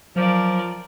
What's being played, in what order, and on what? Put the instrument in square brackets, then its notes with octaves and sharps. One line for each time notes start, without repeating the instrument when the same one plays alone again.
[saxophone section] F3 [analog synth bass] F#3 [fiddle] A#4 D5